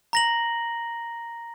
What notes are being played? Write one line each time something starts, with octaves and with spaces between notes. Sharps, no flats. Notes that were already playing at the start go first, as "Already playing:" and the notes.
A#5 A#6 F#7